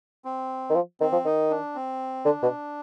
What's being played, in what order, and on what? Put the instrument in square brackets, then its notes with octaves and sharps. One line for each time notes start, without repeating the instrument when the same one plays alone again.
[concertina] C4
[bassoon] D#3
F3
[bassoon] D#3 [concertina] C4
[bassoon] F3
[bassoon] D#3 [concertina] D#4
[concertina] D4
C4
[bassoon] D3 [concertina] D4
[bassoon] B2